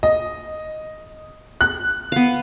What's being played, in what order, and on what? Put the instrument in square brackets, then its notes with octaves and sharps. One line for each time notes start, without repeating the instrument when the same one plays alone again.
[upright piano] D#5
F#6
[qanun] B3 F5